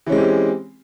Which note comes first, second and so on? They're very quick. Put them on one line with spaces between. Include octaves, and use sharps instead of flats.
E3 C#4 G#3 C4 G4